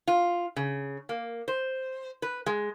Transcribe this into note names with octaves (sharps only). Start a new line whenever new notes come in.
F4
C#3
A#3
C5
B4
G#3